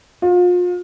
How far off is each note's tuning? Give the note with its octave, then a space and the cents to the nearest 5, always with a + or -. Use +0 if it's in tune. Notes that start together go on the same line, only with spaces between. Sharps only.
F4 +35